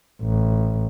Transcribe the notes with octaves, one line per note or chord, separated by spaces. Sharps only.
A1